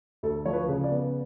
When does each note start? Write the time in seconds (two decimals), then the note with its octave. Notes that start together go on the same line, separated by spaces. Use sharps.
0.23 D2 A4
0.46 F3 C#5
0.53 B4
0.68 C#3
0.84 D5
0.92 B3